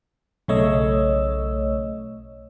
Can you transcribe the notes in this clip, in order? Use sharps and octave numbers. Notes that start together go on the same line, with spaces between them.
B1 C#3 A3 C#5 D#5 E6